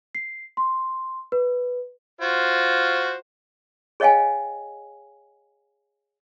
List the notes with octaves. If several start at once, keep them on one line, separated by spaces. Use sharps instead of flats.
C7
C6
B4
F4 F#4 C5
G#4 C#5 D#5 F5 G5 G#5